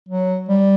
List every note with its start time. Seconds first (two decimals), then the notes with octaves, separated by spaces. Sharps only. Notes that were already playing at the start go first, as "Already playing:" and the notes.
0.09 F#3
0.49 G3